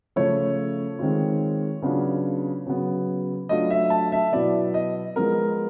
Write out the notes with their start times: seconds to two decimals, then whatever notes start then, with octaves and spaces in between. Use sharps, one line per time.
0.16 C#3 F3 A3 C#5
0.99 D#3 G#3 C4 F4
1.82 C#3 F#3 B3 D4 F4
2.66 C#3 F#3 B3
3.49 F#3 A3 D4 F4 D#5
3.70 E5
3.90 A5
4.12 E5
4.32 B2 F#3 B3 E4 D5
4.74 D#5
5.16 F3 G#3 B3 A#4